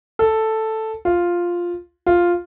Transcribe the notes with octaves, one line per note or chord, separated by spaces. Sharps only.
A4
F4
F4